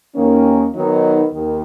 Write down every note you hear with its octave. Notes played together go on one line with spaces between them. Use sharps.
D#2 D#3 A#3 C#4
D#3 F#3 B3 D#4
D#2 D#3